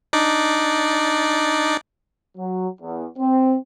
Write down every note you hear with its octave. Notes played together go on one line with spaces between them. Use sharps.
D4 D#4 D5
F#3
E2
C4